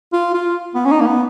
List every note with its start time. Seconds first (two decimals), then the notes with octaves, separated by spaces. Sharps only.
0.13 F4
0.34 F4
0.75 B3
0.86 C#4
0.91 D#4
1.01 A#3
1.06 B3